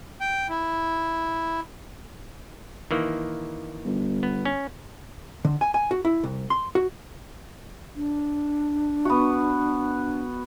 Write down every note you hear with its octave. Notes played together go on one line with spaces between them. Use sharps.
G5
E4
D#3 E3 A#3
G1
B3
C#4
D3
G#5
G#5
F#4
E4
C2
C6
F#4
D4
B3 F#4